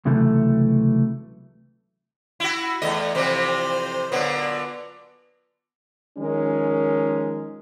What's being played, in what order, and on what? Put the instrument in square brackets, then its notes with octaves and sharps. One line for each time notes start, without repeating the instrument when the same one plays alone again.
[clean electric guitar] C#2 C3 E3 F#3 A3
[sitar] E4 F#4
[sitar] E2 D#5 [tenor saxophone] A3
[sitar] F2 C3 E3 [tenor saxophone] C5
[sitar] A#2 D3 F#3 [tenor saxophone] B3
[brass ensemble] D#3 F3 G#3 C#4 A#4